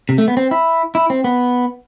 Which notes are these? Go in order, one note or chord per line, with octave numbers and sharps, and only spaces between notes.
C3
A3
B3
C4
E4
E4
C4
B3